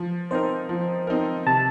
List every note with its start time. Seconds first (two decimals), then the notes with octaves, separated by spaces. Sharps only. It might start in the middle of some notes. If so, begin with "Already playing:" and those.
Already playing: F3
0.31 C4 D#4 A#4 C5
0.69 F3
1.07 C4 D#4 A#4
1.46 C3 A5